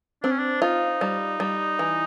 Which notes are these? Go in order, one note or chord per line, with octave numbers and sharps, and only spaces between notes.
C4 D4
C#4
D4
D#4 F4
G3
G3
E3